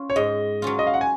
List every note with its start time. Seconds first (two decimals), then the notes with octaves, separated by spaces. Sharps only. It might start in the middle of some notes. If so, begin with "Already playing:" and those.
Already playing: C#4 F4
0.10 C#5
0.16 G#2 D#5
0.62 F#3 C#4 F4
0.79 D#5
0.87 F5
0.94 F#5
1.01 G#5